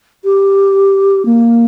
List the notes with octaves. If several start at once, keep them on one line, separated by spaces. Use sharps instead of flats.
G4
A#3